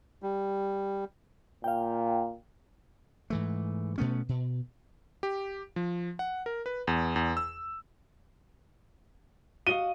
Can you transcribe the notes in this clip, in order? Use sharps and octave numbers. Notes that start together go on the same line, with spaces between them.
G3
A#2 F5 G5
G#2 E3 A3
B2 A3 B3 C#4
B2
G4
F3
F#5
A#4
B4
E2
E2
E6
F#4 D#5 F5 D#7 G7